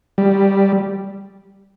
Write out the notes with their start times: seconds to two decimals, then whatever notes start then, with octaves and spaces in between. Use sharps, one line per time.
0.18 G3